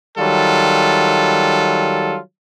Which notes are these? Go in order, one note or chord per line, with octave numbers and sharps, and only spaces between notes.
D#3 F#3 G3 F4 A4